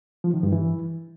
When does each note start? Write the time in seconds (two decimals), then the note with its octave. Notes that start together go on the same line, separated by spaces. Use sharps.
0.24 F3
0.34 D#3
0.43 G2
0.53 E3